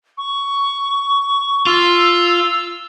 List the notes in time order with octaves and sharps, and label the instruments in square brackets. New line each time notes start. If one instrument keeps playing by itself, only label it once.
[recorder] C#6
[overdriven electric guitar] F4 [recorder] E6